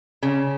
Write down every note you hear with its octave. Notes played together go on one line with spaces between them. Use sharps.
C#3